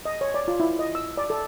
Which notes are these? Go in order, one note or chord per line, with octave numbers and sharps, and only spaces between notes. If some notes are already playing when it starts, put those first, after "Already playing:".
D#5
C#5
D5
F4
E4
D#5
E6
D5
A4